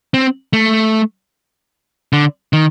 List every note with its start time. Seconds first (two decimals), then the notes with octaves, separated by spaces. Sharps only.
0.14 C4
0.53 A3
2.13 D3
2.53 D#3